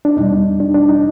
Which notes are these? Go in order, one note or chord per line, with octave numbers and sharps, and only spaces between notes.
D4
E2 B2 G3 D#4
D4
D4
D#4